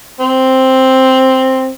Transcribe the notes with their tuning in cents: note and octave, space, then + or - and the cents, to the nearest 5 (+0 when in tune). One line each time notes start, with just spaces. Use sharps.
C4 +0